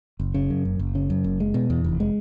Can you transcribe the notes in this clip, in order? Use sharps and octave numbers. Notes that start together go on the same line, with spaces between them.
F#1
C#3
F#2
F#1
F#1
C#3
F#2
F#1
G#3
B2
E2
F1
G#3